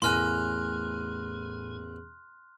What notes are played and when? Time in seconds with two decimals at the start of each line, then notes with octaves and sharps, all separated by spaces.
0.02 A1 E2 A2 A#4 G#5 C6 F6 F#6